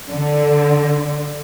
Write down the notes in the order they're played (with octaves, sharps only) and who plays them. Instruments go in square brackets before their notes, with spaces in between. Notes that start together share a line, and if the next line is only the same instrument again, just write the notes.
[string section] D3